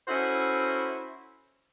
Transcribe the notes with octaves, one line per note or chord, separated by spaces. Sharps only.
C#4 E4 F#4 A4 C5